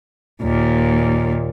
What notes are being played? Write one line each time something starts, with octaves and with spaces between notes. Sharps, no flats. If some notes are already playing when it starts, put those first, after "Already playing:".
D#2 A#2